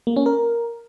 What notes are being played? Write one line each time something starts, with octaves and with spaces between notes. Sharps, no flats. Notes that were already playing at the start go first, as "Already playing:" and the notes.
A#3
C#4
A#4